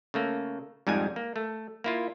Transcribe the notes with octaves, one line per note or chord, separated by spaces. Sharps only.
C#3 A3 A#3
F2 G#2 G3 G#3 G#5
A#3
A3
A#3 E4 F4